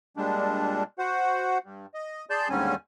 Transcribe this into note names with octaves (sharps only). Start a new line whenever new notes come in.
A#2 G3 G#3 D4
F#4 C5 F#5
G2
D#5
G#4 D5 A5 C6 G6
D#2 G#2 D3 G3 C#4 G#5